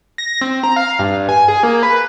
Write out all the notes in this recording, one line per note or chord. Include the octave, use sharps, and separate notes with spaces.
A#6
C4
A#5
F5
G2
G#5
G#4
A#3
B4